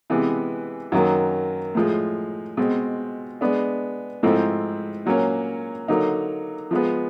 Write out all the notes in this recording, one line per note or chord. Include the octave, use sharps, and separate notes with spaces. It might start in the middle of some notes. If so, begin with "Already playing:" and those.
C3 E3 G#3 B3
F#2 D#3 F#3 A#3
A2 F3 G#3
B2 G#3 C4
G#3 B3 D4
G#2 F3 A3 C4 E4
A#2 F#3 A#3 C#4
D3 F#3 A#3 D#4
F3 G#3 B3